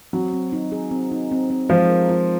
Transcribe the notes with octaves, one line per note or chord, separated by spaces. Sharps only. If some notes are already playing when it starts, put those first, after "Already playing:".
F#3 C4
C4
D#4
G#4
C4
D#4
C4
C4
F3 G#3
A#4
F4